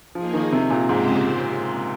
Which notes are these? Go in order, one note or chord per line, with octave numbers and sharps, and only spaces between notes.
F3 A#3 D#4 G#4
D#3
C3
A#2
G#2 C#3 G#3 C4 G4 C5